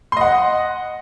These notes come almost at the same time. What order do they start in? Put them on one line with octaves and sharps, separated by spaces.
C6 D#5 F#5